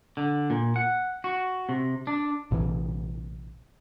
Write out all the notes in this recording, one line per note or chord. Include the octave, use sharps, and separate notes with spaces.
D3
A#2
F#5
F#4
C3
D4
A#1 A2 C3 E3